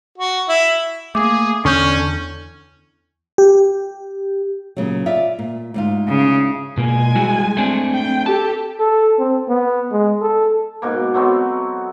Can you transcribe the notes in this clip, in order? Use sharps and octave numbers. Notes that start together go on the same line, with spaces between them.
F#4
E4
A3 A#3 G#4 D6
E2 D3 C#4 C#6 F6 G6
G4
A#2 C#3 F#3
F4 D5 E5
A#2
D2 G#2 F4
C#3
B2 G#3 A#3 G#5
G3 E4 F#4
A3 C4 D4
G5
G4 A4 A5
A4
C4
B3
G#3
A4
G#2 B2 A#3
F#3 A3 B3 C4